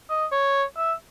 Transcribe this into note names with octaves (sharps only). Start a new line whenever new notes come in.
D#5
C#5
E5